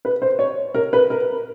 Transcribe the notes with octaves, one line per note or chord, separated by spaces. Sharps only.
B4
C5
C#5
A#4
B4
A#4